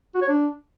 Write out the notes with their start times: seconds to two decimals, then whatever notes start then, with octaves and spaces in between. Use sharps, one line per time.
0.15 F#4
0.22 C#5
0.29 D4